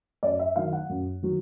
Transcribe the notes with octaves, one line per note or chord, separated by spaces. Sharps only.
F#2 D5
E5
D#3 F#3 F5
F#5
F#2
D#3 F#3